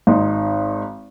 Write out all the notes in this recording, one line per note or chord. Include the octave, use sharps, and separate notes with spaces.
G#1 D#4 C6